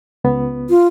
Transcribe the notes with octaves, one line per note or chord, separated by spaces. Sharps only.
C#2 B3
F4